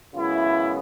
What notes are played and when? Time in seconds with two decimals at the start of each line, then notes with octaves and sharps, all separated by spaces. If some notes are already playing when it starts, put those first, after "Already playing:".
0.15 F#2 C#3 G#3 B3 E4